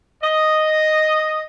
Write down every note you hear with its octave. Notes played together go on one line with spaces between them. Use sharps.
D#5